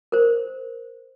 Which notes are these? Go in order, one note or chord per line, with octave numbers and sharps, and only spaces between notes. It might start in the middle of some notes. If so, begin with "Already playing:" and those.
A#4 C5